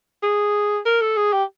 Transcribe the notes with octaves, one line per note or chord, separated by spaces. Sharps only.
G#4
A#4
A4
G#4
G4